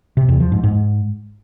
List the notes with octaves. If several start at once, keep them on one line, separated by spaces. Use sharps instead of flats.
C3
E2
F3
G#2
G#2